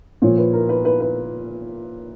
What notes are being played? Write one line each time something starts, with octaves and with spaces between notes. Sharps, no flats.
A#2 F3 C#5
B4
A#4
B4
B4
B4